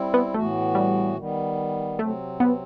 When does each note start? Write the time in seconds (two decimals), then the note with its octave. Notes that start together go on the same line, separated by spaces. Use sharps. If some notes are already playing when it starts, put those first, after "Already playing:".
Already playing: G3 C4 E4
0.14 B3
0.34 A2 E3 A3 B3 F#4
0.75 G3
1.16 D#3 G3 B3
1.98 C3 F#3 A3 C4
2.40 B3